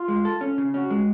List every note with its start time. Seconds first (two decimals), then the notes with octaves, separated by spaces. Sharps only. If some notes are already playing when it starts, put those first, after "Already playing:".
Already playing: F4
0.08 G#3
0.25 A4
0.41 C#4
0.58 C#3
0.74 C#4 F#4
0.90 G#3